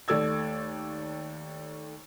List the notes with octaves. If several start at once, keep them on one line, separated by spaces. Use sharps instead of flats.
D#2 A3 D5 E6 G#6